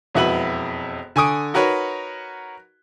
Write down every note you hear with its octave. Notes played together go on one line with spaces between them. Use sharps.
E1 F2 E4 F#4 B4 F#7
D3 G#5 C#6 D#6 D7
D#4 F#4 A#4 B4 C#5